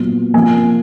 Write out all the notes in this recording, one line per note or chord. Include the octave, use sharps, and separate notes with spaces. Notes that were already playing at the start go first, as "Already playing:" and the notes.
Already playing: A#2 F#3 B3
C3 F3 A#3 G#5